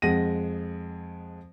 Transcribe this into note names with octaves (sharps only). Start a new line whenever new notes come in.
F2 G#3 F#5 A#6 D#7